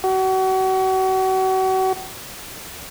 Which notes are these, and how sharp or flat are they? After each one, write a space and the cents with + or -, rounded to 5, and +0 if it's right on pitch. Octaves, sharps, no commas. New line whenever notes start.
F#4 +35